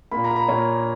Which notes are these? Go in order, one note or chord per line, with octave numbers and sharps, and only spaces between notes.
A#2 A#3 B5
A#5
B5
A#5
A#2 A#3 C#5